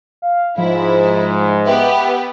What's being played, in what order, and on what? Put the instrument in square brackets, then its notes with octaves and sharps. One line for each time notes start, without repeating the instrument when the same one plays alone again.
[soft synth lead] F5
[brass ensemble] G#2 [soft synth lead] F3 [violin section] E4
[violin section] B3 G4 B4 [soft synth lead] E5